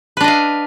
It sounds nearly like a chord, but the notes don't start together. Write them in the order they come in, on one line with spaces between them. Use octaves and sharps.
B4 D4 D#5 F5